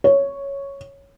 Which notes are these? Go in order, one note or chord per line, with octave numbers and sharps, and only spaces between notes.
C#5